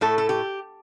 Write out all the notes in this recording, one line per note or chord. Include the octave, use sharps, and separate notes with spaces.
A2 A3 A4
A4
G4